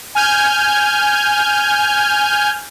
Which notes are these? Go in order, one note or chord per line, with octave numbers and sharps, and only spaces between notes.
G#5 F6 G6 G#6